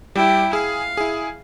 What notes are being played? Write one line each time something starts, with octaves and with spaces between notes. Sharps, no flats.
G3 E4 G5
G#4 F5
E4 G#4